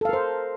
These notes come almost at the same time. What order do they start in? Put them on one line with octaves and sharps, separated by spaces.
A4 F5 A#4 C5